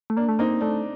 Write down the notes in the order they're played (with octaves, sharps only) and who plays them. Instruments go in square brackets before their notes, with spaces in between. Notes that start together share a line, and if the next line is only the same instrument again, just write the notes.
[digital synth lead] A3
[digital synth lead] A#3 [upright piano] D4
[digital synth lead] A3
[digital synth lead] A#3 [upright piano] C4 D#4
[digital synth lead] A3 [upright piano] D4